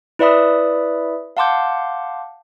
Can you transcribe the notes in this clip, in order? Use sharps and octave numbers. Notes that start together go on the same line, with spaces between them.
E4 B4 D5 E5 B5 D#6
F5 F#5 A5 C6 D6 G6